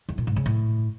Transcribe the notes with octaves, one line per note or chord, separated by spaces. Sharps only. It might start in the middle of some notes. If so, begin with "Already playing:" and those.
E2
A#2
G#2
C#3
A2